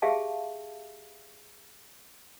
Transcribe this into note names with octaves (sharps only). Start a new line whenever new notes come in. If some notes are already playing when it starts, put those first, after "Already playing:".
G4 G#4 E5 F5 A5